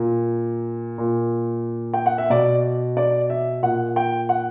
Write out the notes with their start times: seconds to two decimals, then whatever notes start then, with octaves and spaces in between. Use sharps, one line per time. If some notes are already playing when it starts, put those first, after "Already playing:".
Already playing: A#2
0.98 A#2
1.94 G5
2.06 F#5
2.18 E5
2.30 B2 D5
2.97 D5
3.30 E5
3.63 A#2 F#5
3.96 G5
4.29 F#5